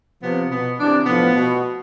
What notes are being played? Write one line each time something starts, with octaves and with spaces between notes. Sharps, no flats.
C3 F3 B3
B2 B3
C3 E3 D4
A2 F3 B3
B2